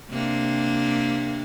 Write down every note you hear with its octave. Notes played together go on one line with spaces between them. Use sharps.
C3 A#3 D4